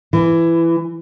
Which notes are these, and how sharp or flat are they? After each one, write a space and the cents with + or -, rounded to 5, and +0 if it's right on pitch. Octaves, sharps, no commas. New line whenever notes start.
E3 +15